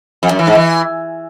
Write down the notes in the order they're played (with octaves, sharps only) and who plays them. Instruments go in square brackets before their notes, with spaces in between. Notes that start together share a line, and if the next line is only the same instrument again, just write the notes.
[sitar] F2
F#2
E3
G#2
E3